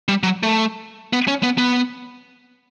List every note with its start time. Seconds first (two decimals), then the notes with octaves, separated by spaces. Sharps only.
0.08 G3
0.23 F#3
0.43 A3
1.13 B3
1.28 C#4
1.43 B3
1.58 B3